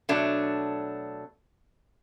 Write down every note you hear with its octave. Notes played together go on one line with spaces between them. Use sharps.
B2 F#3 A3 D4